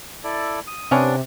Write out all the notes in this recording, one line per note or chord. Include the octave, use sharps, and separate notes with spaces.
E4 A4 D5
D#6
C3 B3 C#4 D4